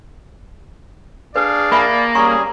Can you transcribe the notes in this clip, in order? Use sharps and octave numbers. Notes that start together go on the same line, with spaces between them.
D4 G#4 B4 D5 F5
A#3 E5 G#5 B5
G3 C#4 G#4 A#5 C#6